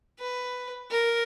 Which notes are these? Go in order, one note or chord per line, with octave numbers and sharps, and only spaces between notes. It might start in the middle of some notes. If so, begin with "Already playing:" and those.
B4
A#4